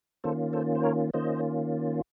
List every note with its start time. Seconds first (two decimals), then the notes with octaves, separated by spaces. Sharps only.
0.24 D#3 A#3 C#4 F4 A4 C5
0.53 A4 C5
0.75 C5
0.83 A#4 C#5
1.14 D#3 A#3 C#4 F4 C5 D#5